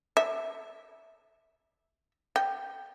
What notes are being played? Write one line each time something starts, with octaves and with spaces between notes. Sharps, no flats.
E5
G5